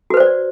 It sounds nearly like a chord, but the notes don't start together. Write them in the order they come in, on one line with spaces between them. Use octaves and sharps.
F#4 B4 C5 D5